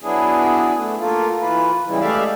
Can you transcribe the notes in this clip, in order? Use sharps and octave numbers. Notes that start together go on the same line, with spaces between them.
F#3 B3 D4 E4 G#4
A3
A3 A#3 F4
E3 F4 B4
C#3 E3 G3 G#3 E4
G#3 A3 G4 D5 E5 F5